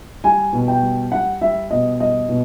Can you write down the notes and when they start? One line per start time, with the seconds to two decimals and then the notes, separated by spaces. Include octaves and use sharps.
0.24 G3 G#5
0.53 B2
0.68 G5
0.83 G3
1.12 G3 F#5
1.42 G3 E5
1.71 B2 D#5
2.00 G3 D#5
2.29 B2